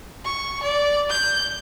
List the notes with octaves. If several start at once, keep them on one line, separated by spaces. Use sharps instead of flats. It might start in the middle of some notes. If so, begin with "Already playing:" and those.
C#6
D5
G6